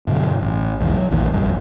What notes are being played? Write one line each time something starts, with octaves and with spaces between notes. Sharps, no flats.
G2 B2 D3 F#3
A1
B1 E2 G#2 D3
F#3
A#1 D#2 A#2 E3
F1 A#1 G2